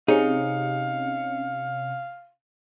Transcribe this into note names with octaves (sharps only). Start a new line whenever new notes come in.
C3 C#4 D#4 G#4 F5 C#7